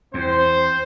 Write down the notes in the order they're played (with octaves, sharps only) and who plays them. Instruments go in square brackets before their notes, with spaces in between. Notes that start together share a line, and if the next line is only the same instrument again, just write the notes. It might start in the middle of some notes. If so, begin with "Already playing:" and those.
[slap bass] E2 [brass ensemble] C4 C5